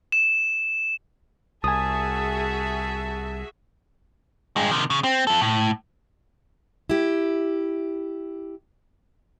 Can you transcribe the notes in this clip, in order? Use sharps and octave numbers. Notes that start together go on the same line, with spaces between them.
E7
C2 F#4 G#4 E5 G#5 A5 D#6
G2 G#3
C3 D#3
C#3
C4
F4 A4
A2
E4 G4